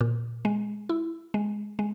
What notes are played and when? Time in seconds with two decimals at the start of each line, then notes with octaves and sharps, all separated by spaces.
0.01 A#2
0.45 G#3
0.89 E4
1.34 G#3
1.79 G#3